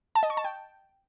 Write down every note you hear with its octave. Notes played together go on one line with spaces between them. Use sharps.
A5
D#5
C#6
A5
G5